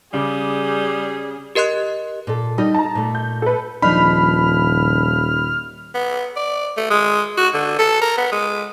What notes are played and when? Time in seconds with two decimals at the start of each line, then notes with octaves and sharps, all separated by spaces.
0.14 C#3 G3 G#4 D6
1.55 G4 A#4 D#5 C6 F#6
2.27 A#2 A4
2.58 G3 D#4 D#5
2.74 A5 A#5
2.95 A#2 A3
3.15 G6
3.42 A4 B4
3.82 D#1 F3 D4 D#4 B5 F6
5.94 B3
6.36 D5
6.77 A3
6.90 G#3
7.37 F#4
7.54 D3
7.79 A4
8.01 A#4
8.17 B3
8.32 G#3